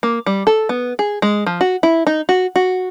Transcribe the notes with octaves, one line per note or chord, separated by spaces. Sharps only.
A#3
G3
A4
B3
G#4
G#3
F3
F#4
E4
D#4
F#4
F#4